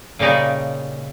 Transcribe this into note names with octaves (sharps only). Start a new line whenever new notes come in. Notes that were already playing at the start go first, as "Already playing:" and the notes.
A#2 C#3 G3 D#4